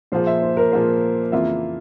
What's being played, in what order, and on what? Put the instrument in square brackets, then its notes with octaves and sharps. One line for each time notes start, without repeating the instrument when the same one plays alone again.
[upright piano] A#2 F3 A#3 F4 G#4 [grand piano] C5
[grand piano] E5
C5
A#4
[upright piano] A#2 F3 A#3 F4 G#4 [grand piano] C5
[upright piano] F2 C#3 E3 A#3 F4 [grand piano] E5